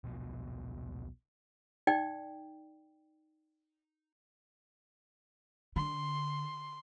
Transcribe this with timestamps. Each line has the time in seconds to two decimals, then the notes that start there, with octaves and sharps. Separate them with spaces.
0.04 D#1 B1 B2 F3
1.87 D#4 D5 G5
5.76 D3 C6